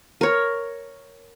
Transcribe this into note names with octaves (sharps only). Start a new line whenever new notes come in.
A#4 C#5